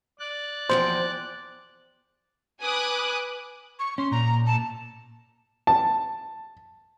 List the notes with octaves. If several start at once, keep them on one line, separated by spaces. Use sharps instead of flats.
D5 F#6
E2 F3 C5 G5
B4 G#5 D6 D#6 F#6
C#6
C#4 C6
A#2 A#5
A5
A5